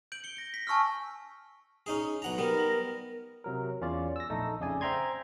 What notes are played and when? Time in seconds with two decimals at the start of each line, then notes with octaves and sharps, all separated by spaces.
0.12 G6 D7 F#7
0.24 C#7 G7
0.37 A#6 G7
0.54 B6
0.67 G#5 A5 C#6 E6 F6
1.86 C#4 D#4 G#4
2.22 B1 F#5 A#5
2.38 G3 B3 A#4
3.44 C3 F#3 A#4
3.81 E2 C#4 F4 D5
4.16 E6 A#6
4.30 A#1 A3 D#4 A4
4.60 F2 C#3 G#4 D5 G#5
4.81 C5 E5 G5 A#5 C6 G#6